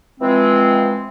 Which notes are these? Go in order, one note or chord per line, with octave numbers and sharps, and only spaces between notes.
E3 F3 G#3 C4